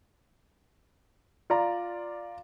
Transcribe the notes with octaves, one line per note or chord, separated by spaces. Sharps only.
F4 D5 A#5